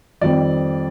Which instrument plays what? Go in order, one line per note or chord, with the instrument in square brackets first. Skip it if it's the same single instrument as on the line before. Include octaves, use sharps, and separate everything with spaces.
[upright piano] F2 D#3 G3 C4 D5